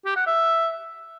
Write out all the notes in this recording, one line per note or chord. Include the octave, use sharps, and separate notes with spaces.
G4
F#5
E5